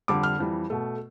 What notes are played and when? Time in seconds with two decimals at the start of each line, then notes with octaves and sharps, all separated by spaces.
0.08 F2 D3 G3 D6
0.23 F6
0.39 F2 E3 G3
0.70 B2 A3